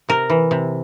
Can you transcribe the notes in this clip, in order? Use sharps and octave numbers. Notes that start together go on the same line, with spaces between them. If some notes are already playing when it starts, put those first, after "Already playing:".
C3 A#4
E3
C3